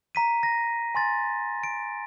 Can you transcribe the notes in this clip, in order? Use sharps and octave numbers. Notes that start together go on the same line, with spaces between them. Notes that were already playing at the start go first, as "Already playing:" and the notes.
A#5 B6 D#7
A#6
G#5 C6 A6
D7